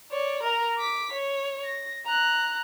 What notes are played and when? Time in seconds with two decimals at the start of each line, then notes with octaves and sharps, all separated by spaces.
0.11 C#5 D5
0.43 A#4 A#5
0.78 D6 B6
1.13 C#5
1.64 A#6
2.06 A#5 F#6